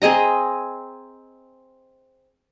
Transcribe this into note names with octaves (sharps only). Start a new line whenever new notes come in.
C4 G#4 D#5 A#5